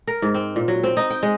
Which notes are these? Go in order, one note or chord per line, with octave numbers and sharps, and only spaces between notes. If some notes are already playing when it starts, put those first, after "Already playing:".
A#4
G#2
C4
A#2
F#3
C4
D#4
G5
G#3